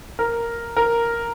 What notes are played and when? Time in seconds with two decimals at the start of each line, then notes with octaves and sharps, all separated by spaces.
0.19 A#4
0.76 A#4